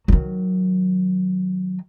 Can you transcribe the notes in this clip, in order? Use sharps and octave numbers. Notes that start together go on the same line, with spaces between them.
D#3 F#3